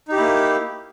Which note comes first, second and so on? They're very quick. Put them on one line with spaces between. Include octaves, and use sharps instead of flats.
D#4 G4 E4 A#3